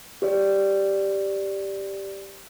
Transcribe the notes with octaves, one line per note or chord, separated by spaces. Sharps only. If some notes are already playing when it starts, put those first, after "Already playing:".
G4 C5 D5